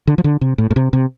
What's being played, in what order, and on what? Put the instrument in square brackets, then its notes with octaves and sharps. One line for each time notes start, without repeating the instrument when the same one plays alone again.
[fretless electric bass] D3
F3
D3
C3
A2
A2
C3
C3